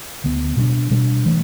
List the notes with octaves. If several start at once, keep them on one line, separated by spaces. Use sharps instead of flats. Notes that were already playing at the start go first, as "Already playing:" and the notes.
D2 D3 B3
B2 G3 B3 D4
B2 G3 B3 D4
E3 A3